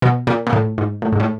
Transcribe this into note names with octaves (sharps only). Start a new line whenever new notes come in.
B2
A#2
A#2
A2
G#2
A2
G#2
A2